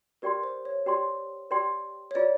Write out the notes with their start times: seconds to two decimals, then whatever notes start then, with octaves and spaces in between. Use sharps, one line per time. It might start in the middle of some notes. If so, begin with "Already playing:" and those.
0.22 G4 A#4 B4 D5 G5 C6
0.43 C5
0.65 C#5
0.86 G4 B4 D5 G5 C6
1.51 G4 B4 D5 G5 C6
2.11 C#5
2.15 F4 G#4 B4 D5